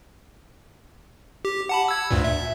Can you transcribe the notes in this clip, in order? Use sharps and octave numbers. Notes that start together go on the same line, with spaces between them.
G4
F#5 A5 B5
E6 G#6
D2 G2 A#2
E5